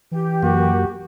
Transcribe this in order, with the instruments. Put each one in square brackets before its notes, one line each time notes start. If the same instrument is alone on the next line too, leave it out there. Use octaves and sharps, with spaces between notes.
[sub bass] E3 [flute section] G4
[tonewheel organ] F#2 A#3 [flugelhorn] F#4